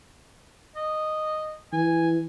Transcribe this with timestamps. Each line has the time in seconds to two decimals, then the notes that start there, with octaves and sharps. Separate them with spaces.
0.76 D#5
1.73 E3 G#5